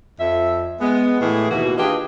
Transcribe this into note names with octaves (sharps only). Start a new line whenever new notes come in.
F2 E5
G#3 B3
A2 E3 G#4
D#2 B2 E3 A#3 F#4
D4 F4 G4 G#4 B4 D#5